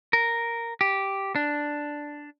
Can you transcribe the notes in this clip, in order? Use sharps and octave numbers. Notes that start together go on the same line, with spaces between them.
A#4
G4
D4